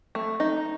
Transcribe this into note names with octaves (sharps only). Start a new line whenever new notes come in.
A3
D#4